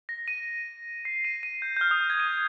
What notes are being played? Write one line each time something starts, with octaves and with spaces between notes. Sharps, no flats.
A#6
D#7
C7
D#7
D#7
G6
G6
F6
D#6
F6
G#6
D#7